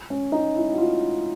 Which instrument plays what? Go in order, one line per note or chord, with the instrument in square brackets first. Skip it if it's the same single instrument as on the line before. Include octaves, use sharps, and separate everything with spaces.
[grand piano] C#4
D#4
E4
F#4
F4